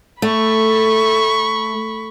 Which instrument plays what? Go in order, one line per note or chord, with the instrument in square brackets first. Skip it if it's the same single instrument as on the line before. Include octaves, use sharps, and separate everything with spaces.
[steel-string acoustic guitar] A3 [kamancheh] B5 C#6